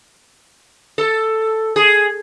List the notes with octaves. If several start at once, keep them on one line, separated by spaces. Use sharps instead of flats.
A4
G#4